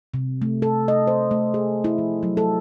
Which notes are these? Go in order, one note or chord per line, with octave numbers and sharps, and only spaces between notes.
C3
A3
A4
D#5
C5
A3
G#4
E4
F3
F#3
A4